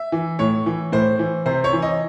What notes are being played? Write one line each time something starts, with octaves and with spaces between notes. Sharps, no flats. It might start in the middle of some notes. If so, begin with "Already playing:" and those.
Already playing: E5
E3
A2 C#5
E3
A2 C5
E3
C3 C5
C#5
E3
D#5